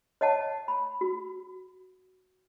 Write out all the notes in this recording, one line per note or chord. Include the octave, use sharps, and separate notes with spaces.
C#5 D#5 F#5 A5
B5
F#4